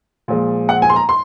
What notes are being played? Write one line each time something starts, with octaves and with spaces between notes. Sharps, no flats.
A#2 F3 G#3
F#5
G#5
C6
A#5
C6